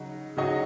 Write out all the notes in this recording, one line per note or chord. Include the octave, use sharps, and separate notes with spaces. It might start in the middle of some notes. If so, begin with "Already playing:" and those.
Already playing: C#3 F#3 D#4 F#4
C#3 F#3 D#4 F#4 D#5